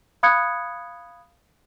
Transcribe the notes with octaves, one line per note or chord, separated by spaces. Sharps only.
F5 B5 D#6 F#6 G#6 C#7